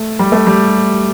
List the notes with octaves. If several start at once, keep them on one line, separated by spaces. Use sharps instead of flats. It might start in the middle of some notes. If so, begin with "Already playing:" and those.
Already playing: A3
G3
A3
G3